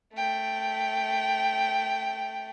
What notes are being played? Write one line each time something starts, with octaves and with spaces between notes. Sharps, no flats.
A3 G5